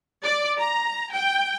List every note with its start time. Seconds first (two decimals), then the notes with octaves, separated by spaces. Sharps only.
0.23 D5
0.59 A#5
1.13 G5